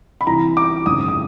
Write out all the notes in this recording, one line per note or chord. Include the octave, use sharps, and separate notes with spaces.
B5
C2 C3 E3 A#5
D6
G#1 F#2 C#3 D#6
D#6